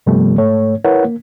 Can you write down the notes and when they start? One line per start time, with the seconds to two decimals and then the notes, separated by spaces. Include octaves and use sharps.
0.06 G2 C3 F3 G3 A3 B3
0.38 G#2 A3 C#5
0.85 E4 A#4 B4 C#5 F#5
1.05 A#3